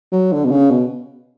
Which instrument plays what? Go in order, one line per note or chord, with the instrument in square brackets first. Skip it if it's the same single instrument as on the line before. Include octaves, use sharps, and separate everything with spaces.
[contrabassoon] F#3
D3
B2
C#3
B2